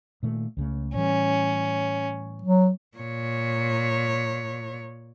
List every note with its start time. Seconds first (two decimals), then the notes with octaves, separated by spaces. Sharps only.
0.23 A#2 D#3 A3
0.57 C#2 C#3 A3
0.95 A2 E3 G3 C#4
2.42 F#3
2.97 A#2 C#5